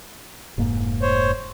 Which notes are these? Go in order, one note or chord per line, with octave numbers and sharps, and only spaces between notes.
F1 G#2 A#3
C5 C#5